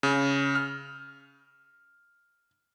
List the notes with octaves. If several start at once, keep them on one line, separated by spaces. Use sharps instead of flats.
C#3
F6